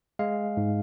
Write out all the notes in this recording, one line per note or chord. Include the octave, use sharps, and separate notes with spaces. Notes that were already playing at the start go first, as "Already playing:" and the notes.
G#3 F5
G#2